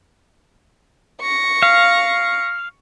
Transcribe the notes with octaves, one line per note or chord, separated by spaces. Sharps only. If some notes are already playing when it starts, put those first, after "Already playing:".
C#6 A#6
F5